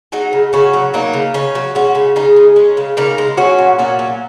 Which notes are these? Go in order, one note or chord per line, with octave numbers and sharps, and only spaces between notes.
F#3 D#4 G#4
C#3
C#3 C#4 F#4
F#3
F#3 A#3 D#4
C#3
C#3 C#4
F#3
G#3 C#4 F#4
C#3
C#3 D#4 G#4
G#3
G#3 C#4
C#3
C#3 A#3 D#4
G#3
F#3 C#4 F#4
A#2
A#2 C#4 F#4
F#3